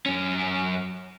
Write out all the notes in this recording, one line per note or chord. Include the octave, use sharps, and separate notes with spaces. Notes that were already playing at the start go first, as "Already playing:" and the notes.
F#2 C#4